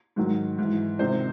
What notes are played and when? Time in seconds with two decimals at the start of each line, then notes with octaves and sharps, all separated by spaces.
0.16 G#2 D#3 F#3
0.58 G#2 E3
0.99 C#2 C3 D#3 C5